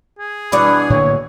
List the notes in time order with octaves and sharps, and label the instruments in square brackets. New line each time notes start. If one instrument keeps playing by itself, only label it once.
[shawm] G#4
[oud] B2 E3 D4 [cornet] B5
[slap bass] A2 D3 A#3 [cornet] C#5